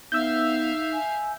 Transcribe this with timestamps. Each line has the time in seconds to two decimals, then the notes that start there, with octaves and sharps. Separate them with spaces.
0.12 B3 D#4 E5 F5 E6 G6
0.93 G#5